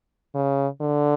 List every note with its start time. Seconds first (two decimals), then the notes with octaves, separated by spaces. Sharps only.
0.35 C#3
0.81 D3